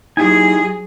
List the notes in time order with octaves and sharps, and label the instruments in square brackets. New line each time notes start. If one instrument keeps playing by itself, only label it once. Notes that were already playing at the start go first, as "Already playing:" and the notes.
[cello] F#3 G#4 [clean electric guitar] D#4 E4 G4 [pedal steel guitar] G#5